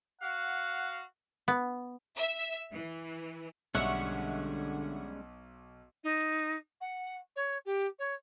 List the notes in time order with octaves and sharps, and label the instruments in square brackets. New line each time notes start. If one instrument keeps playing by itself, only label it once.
[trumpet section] F#4 F5 [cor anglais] F#5
[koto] B3
[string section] E5
E3
[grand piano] B1 [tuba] D3 [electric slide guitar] G3 G#3 C#4 [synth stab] E5 F#5 C#6
[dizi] D#4
F#5
C#5
G4
C#5